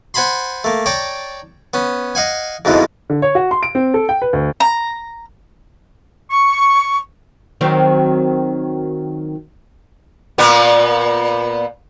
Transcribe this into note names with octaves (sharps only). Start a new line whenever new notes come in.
C5 F#5 G#5 A5 B5 C6
A3 A#3
C#5 D5 G5 A5 A#5
B3 C#4
D#5 F5 F#5 G#5
F2 G#2 B2 E3 G#3
D3
C#5
F#4
C6
D7
C4
A4
G5
B4
D2
A#5
C#6
D#3 F#3 C4
A#2 B3